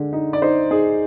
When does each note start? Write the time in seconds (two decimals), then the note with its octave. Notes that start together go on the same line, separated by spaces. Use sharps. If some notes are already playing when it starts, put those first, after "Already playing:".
Already playing: D3 G#3
0.13 D#4
0.33 D5
0.42 D#4 C5
0.71 D#4 G#4